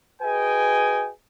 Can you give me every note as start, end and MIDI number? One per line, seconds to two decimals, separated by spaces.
0.22 1.10 66
0.22 1.10 68
0.22 1.10 71
0.22 1.10 75
0.22 1.10 79
0.22 1.10 80